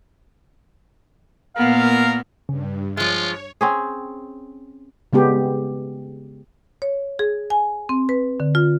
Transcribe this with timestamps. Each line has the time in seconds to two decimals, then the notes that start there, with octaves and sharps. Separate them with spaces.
1.56 A#2 B3 A#4 F5
2.49 G2 C#3
2.97 F3 G#3 F4 C#5
3.61 C4 C#4 G#4
5.13 C#3 G#3 B3 G4
6.82 C#5
7.19 G#4
7.50 G#5
7.89 C4
8.09 B4
8.40 D3
8.55 F4